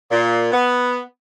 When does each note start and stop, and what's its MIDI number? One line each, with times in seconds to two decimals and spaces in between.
0.12 0.49 46
0.52 1.01 59